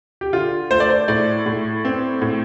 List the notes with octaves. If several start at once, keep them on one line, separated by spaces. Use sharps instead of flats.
G4
D3 F4
A3 C5
D5
C5
A2 D5
A2
C4
A2